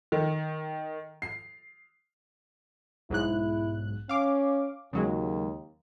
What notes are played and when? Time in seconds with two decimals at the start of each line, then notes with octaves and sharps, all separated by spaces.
0.12 D#3
1.22 C7
3.10 B1 G#2 E4 F#6
4.09 C#4 F5 D6
4.93 D#2 C#3 F#3 G#3